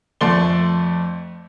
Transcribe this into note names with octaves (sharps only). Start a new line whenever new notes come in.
F2 A3 D5 C6 G7